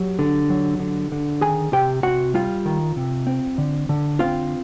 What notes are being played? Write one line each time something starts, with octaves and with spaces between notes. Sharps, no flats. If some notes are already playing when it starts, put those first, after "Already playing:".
Already playing: F#3 G4
D3
F#3
D3
D3
D#3 G#4 G#5
C3 G4 G5
C3 F#4 F#5
G3 F4 F5
D#3
C3
C4
D3
D3
C4 F4 F5